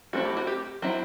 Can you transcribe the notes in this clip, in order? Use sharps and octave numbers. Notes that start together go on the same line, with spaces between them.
A3 C4 E4 F#4
G4
F#4
G4
F#3 C4 E4